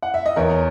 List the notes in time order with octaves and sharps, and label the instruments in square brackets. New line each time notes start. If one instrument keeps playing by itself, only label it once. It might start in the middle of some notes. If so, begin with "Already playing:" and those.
[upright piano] F#5
E5
D#5
[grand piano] E2 [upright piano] A#4 C#5